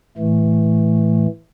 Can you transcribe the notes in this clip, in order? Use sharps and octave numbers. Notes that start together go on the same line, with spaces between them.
A2 E3 A3